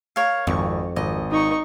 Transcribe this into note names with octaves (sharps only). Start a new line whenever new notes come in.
A#4 C#5 F5
G#1 F2 C#6
G#1 D#5
D#4 C#6